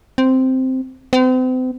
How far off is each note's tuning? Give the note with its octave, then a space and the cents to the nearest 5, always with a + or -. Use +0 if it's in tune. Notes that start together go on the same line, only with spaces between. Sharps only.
C4 -5
C4 -40